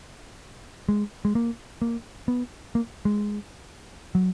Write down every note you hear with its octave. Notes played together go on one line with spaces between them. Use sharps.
G#3
G#3
A#3
A#3
B3
A#3
G#3
F#3